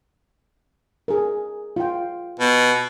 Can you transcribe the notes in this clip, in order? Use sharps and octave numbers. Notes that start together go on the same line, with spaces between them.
G#4 A#4
F4 G5
B2